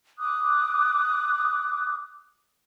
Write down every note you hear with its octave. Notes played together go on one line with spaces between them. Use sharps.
D6 D#6 F#6